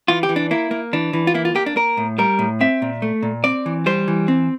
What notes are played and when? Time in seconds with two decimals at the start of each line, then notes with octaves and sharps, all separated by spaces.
0.08 E3 F4
0.23 G4
0.29 E3
0.36 D4
0.51 A#3 E4
0.71 A#3
0.93 E3 D4
1.13 E3
1.27 F4
1.34 A#3 E4
1.45 F4
1.55 A#3 G4
1.66 D4
1.76 A#3 A#4
1.97 A2
2.18 G3 A#4
2.39 A2
2.61 C4 E5
2.82 A#2
3.02 A3
3.23 A#2
3.44 C4 D5
3.66 E3
3.86 G3 C5
4.08 E3
4.28 C4